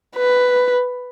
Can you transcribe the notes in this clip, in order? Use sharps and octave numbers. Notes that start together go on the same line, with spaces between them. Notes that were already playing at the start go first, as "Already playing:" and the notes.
B4